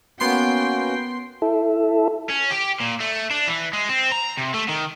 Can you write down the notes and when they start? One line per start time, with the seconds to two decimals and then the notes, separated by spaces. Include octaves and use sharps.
0.20 A#3 B3 C#4 F#4 G5 C6 C7
1.42 E4 A4
2.29 C#4
2.51 G4
2.80 A#2
3.00 A3
3.31 D4
3.48 E3
3.73 G#3
3.89 C4
4.12 A#5
4.38 C3
4.54 A3
4.69 D#3